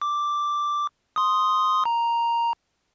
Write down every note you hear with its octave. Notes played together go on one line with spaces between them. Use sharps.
D6
C6 D#6
A#5